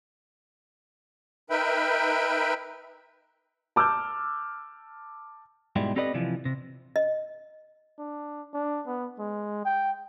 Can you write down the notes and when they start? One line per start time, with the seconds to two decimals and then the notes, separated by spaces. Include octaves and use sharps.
1.50 D#4 A#4 B4 E5 G5 B5
3.76 A5 D6 E6 F6 G6
5.76 G#2 B2 G3 G#3 E4
5.96 C4 G4 A4 B4 D5 D#5
6.14 C3 E3 F3
6.45 C3
6.96 D#5
7.98 D4
8.53 D4
8.86 B3
9.19 G#3
9.65 G5